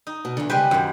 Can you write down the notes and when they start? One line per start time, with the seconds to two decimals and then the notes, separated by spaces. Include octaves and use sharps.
0.07 D#4
0.25 B2
0.37 E2 D3
0.50 C#3 G3 G#3 G4 B4 C5
0.71 F#2 A#2 D#3